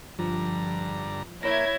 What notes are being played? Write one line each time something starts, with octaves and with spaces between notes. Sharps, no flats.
G2 D3 F3 A#5
A#3 E4 C#5 G#6 A#6